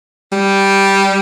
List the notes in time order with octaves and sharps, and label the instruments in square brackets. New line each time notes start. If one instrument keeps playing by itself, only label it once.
[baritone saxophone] G3